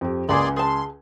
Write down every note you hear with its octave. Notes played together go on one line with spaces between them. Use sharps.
F2 G4
C#2 A#3 G#4 D5 G#5 B5 C6
G#4 A5 C6